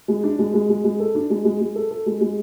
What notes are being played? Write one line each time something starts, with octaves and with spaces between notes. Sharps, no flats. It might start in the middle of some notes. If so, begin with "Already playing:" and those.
G#3
D4
G#3
G#3
G#3
G#3
A4
D4
G#3
G#3
G#3
A4
A4
G#3
G#3